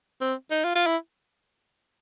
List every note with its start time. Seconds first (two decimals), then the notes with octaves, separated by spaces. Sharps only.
0.21 C4
0.51 D#4
0.64 F4
0.76 F4
0.87 E4